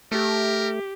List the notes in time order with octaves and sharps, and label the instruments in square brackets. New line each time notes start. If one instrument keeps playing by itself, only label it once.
[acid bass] A3 [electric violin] G4 [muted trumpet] A#4